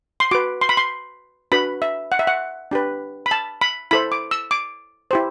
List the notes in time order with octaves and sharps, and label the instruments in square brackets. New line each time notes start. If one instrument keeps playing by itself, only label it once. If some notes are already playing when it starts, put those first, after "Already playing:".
[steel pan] C6
F#4 B4 D6
C6
B5
C6
D4 F#4 B4 B5
E5
F#5
E5
F#5
D4 G4 B4
B5
A5
B5
E4 A4 C5 B5
D6
E6
D6
E4 G4 C5